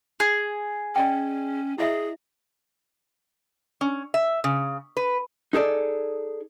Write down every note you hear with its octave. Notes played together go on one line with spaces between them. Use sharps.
G#4
C#4 D5 D#5 G5
E4 G#4 D#5 E5
C#4
E5
C#3
B4
D#4 G#4 A4 D5